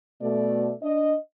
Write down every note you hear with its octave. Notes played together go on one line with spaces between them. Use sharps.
B2 A3 D5
D4 D#5